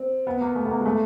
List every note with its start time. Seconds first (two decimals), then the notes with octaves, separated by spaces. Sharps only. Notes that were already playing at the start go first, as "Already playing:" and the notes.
Already playing: C4
0.27 B3
0.41 A#3
0.55 A3
0.65 B3
0.71 A#3
0.81 G#3
0.85 A3